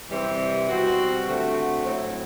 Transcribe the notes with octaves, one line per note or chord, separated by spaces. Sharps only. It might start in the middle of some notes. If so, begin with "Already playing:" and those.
C3 E3 G3 C4
B2 G3 C4 F#4
D3 A3 C4 F#4
A2 F#3 C4 E4